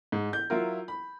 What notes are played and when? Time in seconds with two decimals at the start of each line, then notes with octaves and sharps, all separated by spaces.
0.12 G#2
0.33 G6
0.50 F#3 E4 F4 A#4
0.88 B5